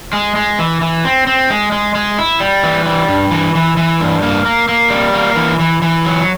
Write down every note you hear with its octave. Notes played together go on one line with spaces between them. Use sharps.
G#3
G#3
E3
E3
C4
C4
G#3
G#3
G#3
E4
G3
E3
G3
G2
E3
E3
E3
G2
A#3
A#3
A#3
G3
A#3
E3
E3
E3
F#3